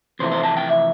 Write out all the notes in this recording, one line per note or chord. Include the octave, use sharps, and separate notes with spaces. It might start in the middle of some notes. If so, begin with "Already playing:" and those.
F2 C3 E3 A3 C5
C5
A5
G5
E5